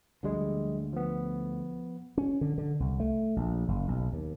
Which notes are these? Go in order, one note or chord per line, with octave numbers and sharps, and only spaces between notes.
D2 D3 F3 G3 G#3
F3 B3
C#4
D3
D3
C2
A3
A#1
F#1
B1
D#2